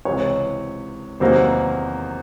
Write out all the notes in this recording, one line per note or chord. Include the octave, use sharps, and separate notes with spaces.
C#2 C3 E3 C#5
E2 C3 D#3 F#3 A#3 C5